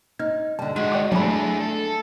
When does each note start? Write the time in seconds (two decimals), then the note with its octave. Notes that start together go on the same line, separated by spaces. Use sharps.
0.19 D#4 F6 G#6
0.59 D3 G3 A5
0.76 D#3 G#3 F#4 D7
0.92 D5 G5 D6
1.12 F#3 A3 D4 E4 G#4 B5
1.60 A4